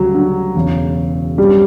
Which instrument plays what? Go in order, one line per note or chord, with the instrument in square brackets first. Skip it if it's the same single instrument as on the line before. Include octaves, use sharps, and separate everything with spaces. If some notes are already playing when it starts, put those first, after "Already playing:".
Already playing: [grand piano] D2 C#3 G3 [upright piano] F#3
[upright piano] D3
[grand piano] E1 E2 C#3
[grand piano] G2 F#3 C#4 G4 [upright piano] G3